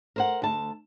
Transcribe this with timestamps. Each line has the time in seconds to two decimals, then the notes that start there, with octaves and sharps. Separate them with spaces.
0.16 A#4 C5 F#5
0.42 D2 A5